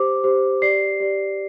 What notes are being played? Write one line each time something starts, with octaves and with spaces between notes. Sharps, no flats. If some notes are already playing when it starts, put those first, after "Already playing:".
Already playing: G4 C5 D6
G4 C5
G4 D5 C7
G4 D5